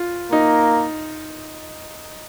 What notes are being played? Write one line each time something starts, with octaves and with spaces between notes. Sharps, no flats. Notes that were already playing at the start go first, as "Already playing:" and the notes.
Already playing: F4
A#3 D#4